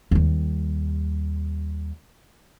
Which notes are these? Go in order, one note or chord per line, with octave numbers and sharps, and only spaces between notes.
D#2 G3